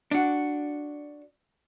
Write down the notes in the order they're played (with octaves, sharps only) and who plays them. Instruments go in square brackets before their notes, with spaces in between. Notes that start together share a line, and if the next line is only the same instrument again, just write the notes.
[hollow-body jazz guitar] D4 F#4